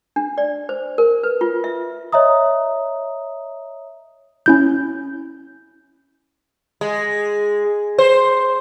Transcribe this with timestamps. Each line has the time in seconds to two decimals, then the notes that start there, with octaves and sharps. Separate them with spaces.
0.16 D4
0.38 D5
0.69 C5
0.98 A#4
1.23 B4
1.41 F4
1.64 E5
2.12 C#5 D#5 E5 A#5 D#6
4.46 C#4 E4 G6
6.81 G#3
7.98 C5